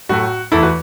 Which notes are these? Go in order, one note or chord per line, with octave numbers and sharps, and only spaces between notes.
A2 F#3 A3 F#4
E2 E3 A3 E4 A4
F#4 B4